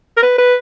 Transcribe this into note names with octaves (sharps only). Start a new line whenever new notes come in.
A#4
B4
B4